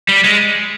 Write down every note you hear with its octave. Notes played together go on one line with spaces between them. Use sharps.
G3
G#3